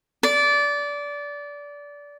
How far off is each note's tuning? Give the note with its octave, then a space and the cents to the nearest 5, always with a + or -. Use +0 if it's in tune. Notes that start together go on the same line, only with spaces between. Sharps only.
D5 -20